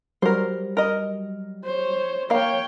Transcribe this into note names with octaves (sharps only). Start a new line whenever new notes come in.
F#3 G3 A#4 C5
A#4 D#5
C5 C#5
A#3 C#5 F5 G5